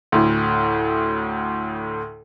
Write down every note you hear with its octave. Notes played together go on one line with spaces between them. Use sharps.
D2 A2